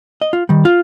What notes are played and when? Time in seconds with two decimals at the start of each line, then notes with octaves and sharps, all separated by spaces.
0.22 D#5
0.33 F4
0.49 D#3 G3
0.65 F4